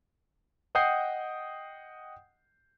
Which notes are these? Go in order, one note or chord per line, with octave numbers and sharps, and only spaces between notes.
D#5 F#5 G5 D#6 G6 C7